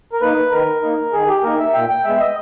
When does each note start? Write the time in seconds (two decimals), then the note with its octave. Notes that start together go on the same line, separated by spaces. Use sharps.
0.13 A#4
0.21 A#3 D#4 B4
0.52 D#3 A#4
0.82 A#3 D#4
1.13 D#3 G#4
1.28 G4
1.43 A#3 D#4 A#4
1.59 E5
1.74 A#2 G5
1.89 G5
2.05 G#3 B3 E5
2.20 D#5